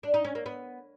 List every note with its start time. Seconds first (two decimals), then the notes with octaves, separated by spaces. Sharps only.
0.03 D4
0.14 D#4
0.25 C#4
0.35 A#3
0.46 B3